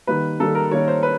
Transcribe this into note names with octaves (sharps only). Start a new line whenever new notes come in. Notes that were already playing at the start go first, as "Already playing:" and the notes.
D#3 G3 A#3 B4
D#3 G3 A#3 A4
A#4
D#3 G3 A#3 C#5
C5
B4